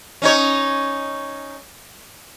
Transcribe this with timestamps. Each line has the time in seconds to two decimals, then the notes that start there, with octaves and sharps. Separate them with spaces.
0.22 C#4 D#4 C#5